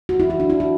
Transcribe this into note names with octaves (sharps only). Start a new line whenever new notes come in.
F#4
E4
F#4
D4
E4
F#4